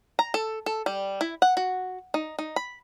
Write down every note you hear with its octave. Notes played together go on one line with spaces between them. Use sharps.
A#5
A4
A4
G3
E4
F#5
F#4
D#4
D#4
B5